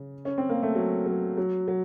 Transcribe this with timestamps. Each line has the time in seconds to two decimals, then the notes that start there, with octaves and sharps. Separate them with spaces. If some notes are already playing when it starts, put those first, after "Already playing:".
Already playing: C#3
0.25 C#4
0.38 C4
0.50 A#3
0.63 A3
0.75 F#3
1.06 F#3
1.37 F#3
1.68 F#3